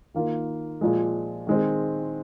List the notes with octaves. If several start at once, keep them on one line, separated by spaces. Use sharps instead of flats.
D#3 A#3 F4
A#2 F3 G#3
D#3 G#3 C4